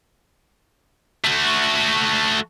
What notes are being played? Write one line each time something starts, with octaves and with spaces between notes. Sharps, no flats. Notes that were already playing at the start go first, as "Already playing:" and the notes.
A3 F#4